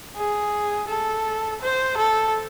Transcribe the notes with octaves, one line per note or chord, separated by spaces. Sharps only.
G#4
A4
C5
A4